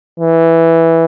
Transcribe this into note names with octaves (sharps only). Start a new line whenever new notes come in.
E3